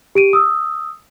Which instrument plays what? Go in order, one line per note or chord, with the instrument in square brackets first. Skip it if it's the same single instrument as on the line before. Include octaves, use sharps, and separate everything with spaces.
[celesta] G4 D7 D#7
D#6 E6